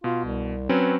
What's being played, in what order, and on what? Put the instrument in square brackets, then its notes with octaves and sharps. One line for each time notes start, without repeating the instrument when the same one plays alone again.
[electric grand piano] B2 [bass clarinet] F4
[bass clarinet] C2
[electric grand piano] F#3 C4 C#4 [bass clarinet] B4